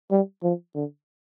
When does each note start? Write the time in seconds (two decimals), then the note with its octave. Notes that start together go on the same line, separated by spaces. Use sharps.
0.11 G3
0.43 F3
0.75 D3